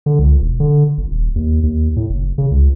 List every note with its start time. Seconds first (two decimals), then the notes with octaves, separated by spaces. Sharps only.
0.06 D3
0.19 C#2
0.41 E1
0.60 D3
0.98 G1
1.11 D#1
1.36 D#2
1.63 D#2
1.96 A2
2.10 F#1
2.38 C#3
2.51 C#2